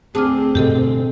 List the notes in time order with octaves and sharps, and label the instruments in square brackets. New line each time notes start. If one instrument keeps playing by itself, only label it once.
[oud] D2 G#4 [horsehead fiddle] C4 [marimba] A5 D6 F6
[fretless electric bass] G2 B2 D3 [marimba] G4 A4 D#5